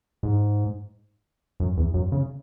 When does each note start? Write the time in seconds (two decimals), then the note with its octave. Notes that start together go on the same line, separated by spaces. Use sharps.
0.23 G#2
1.60 F#2
1.77 E2
1.94 F#2
2.12 C#3